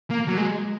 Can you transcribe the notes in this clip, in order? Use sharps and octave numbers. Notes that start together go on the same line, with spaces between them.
A#3
F#3
G#3